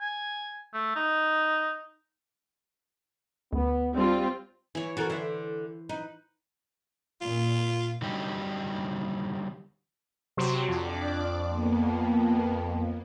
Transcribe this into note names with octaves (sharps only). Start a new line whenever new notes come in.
G#5
A3
D#4
D2 B3
G3 C4 D4 F4
E3 E4 C#5
E3 F#4 A4 A#4 C#5
D3 E4 C5 E5
D#4 B4
A#2 F4
D3 F#3 G3 D#4 G4
C3 F#3 C4
F2 D4 D5 D6
A#3 B3